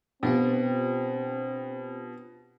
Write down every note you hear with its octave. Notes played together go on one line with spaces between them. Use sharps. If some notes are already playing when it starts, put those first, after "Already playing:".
B2 C4 D4 F4 G4